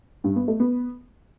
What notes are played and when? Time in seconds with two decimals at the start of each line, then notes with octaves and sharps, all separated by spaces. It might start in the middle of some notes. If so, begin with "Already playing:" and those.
0.24 G2
0.36 B3
0.48 A3
0.60 B3